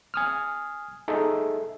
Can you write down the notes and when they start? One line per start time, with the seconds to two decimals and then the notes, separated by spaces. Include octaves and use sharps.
0.14 G#5 D#6 F6
1.08 D#4 G#4 A4 E5